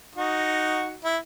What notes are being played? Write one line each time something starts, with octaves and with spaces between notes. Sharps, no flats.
D#4 F#4
E4